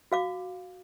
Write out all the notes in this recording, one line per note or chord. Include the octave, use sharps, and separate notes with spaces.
F#4 F5 D6